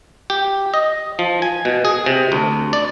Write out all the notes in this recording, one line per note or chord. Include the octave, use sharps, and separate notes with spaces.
G4
D#5
F3
G#5
B2
G#4
C3
D2
D5